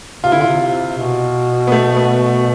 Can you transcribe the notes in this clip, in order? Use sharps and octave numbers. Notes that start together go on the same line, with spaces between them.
C3 F4
D3 E4
F4
C3
C3
B2
B3
A3
B3